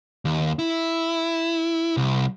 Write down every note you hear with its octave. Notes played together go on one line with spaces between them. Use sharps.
D#2
E4
C2